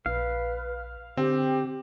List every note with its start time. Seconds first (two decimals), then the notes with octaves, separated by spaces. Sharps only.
0.06 A#1 B4 F5
1.17 D3 C4 G4